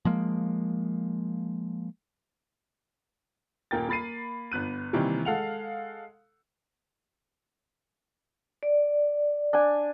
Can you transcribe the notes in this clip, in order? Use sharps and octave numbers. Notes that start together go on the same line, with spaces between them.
F3 G#3 A#3
D#1 A#3 A#4 G5 A6
A#3 B5 A6 C7 D#7
G1 B3 F#6 D#7
C3 D#3 E3 G3 A#3
G#3 A4 F5 F#5 F7
D5
D4 G#5